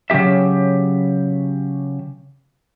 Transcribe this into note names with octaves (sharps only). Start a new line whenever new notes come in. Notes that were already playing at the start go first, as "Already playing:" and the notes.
C#3 F#3 A#3 G4 E5